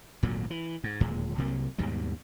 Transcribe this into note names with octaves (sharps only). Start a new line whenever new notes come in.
G#1 D2 A#2 F#3
E3
G#2
D1 D#2 A#2 G#3
C2 C3 F#3 A#3
D#2 G#2 B2 G3